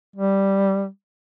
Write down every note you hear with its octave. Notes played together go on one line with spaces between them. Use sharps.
G3